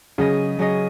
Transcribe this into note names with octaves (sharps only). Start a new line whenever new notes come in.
C#3 F#3 C#4 G#4 D#5
F#3 C#4 G#4 D#5